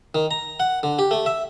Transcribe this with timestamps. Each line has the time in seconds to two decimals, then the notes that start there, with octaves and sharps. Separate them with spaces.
0.15 D#3
0.31 A#5
0.60 F#5
0.83 D3
0.99 G4
1.11 A3
1.26 E5